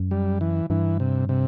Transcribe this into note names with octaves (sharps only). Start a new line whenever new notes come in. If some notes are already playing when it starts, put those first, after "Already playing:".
Already playing: F#2
G3
E3
G2 E3
C3
C3